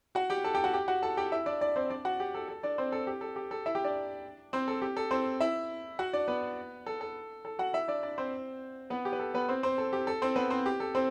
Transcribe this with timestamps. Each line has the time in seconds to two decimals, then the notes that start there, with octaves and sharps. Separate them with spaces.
0.15 F#4 F#5
0.30 G4 G5
0.44 A4 A5
0.55 G4 G5
0.64 F#4 F#5
0.74 G4 G5
0.88 F#4 F#5
1.02 A4 A5
1.17 G4 G5
1.32 E4 E5
1.46 D4 D5
1.61 D4 D5
1.76 C4 C5
1.90 D4 D5
2.05 F#4 F#5
2.20 G4
2.35 A4
2.48 A4
2.63 D4 D5
2.78 C4 C5
2.92 A4
3.07 G4
3.21 A4
3.36 G4
3.51 A4
3.66 E4 E5
3.75 G4 G5
3.84 D4 D5
4.53 C4 C5
4.68 A4
4.82 G4
4.97 A4
5.11 C4 C5
5.41 E4 E5
5.99 F#4 F#5
6.13 D4 D5
6.28 B3 B4
6.86 A4
7.01 A4
7.45 A4
7.59 F#4 F#5
7.73 E4 E5
7.88 D4 D5
8.03 D4 D5
8.18 C4 C5
8.90 B3 B4
9.05 G4
9.13 B4
9.19 A4
9.34 B3 B4
9.49 C4 C5
9.63 C4 C5
9.78 A4
9.93 G4
10.07 A4
10.22 C4 C5
10.36 B3 B4
10.50 C4 C5
10.66 G4
10.80 A4
10.95 C4 C5